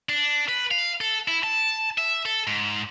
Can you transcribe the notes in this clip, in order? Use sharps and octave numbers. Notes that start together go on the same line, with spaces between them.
D4
B4
F5
A4
E4
A5
E5
A4
G#2